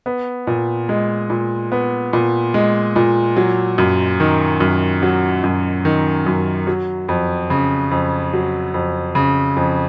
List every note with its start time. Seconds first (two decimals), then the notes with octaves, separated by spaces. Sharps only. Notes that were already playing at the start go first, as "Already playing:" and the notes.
0.06 B3
0.47 A#2
0.89 G#3
1.30 A#2
1.72 B3
2.13 A#2
2.54 G#3
2.96 A#2
3.37 F#3
3.78 F#2
4.20 D#3
4.60 F#2
5.03 F#3
5.44 F#2
5.85 D#3
6.26 F#2
6.67 F#3
7.09 F2
7.50 C#3
7.91 F2
8.33 F#3
8.74 F2
9.15 C#3
9.57 F2